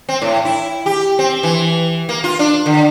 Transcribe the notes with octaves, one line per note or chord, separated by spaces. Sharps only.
C4
A2
E4
G4
C4
E3
A#3
F4
D4
D3